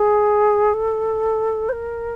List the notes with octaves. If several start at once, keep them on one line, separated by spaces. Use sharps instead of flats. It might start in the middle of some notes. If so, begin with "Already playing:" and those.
Already playing: G#4
A4
C5
A#4